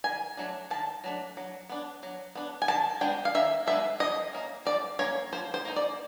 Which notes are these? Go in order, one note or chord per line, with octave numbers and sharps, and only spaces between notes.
D#3 G#5
F#3 A3 D4
D#3 A5
F#3 A3 D4
F#3
B3 D4
F#3
B3 D4
G#5
D#3 A5
G#3 B3 D4 G5
F5
D#3 E5
G#3 B3 D4 E5
F3 D#5
A#3 C#4
F3 D5
A#3 C#4 C#5
F3 C5
C5
A#3 D#4
D5